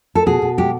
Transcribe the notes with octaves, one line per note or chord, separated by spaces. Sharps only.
A4
B2 G#4
B2
G#3 G4